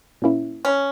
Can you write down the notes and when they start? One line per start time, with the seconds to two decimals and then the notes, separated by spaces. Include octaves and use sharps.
0.22 A#2 A#3 C#4 E4
0.65 C#4